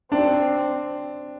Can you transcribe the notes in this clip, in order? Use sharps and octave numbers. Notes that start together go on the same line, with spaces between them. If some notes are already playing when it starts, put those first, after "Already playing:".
C4 D4